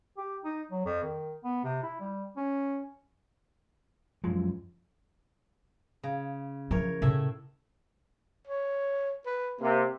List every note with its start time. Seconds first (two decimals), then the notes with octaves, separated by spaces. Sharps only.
0.17 G4
0.45 D#4
0.72 F#3
0.85 F2
1.03 D#3
1.44 B3
1.64 C3
1.83 E4
2.00 G3
2.37 C#4
4.24 F#2 F3 F#3 G#3 F4
6.03 C#3
6.71 F3 E4 A#4 C#5
7.02 A2 C#3 A3 E5
8.47 C#5
9.26 B4
9.61 C3 A#3